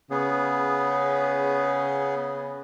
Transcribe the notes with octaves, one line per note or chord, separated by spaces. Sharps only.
C#3 B3 G#4